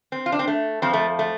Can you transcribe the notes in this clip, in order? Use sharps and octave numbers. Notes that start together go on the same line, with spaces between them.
C4
F4
D4
C4
A3
F2 F3 C4
A3
A3